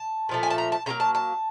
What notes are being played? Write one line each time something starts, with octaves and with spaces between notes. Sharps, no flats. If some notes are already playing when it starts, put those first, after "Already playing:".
Already playing: A5
A#2 F3 A3
G#5
A5
A#5
A5
C#3 F#3 A#3 A#5
A5
A5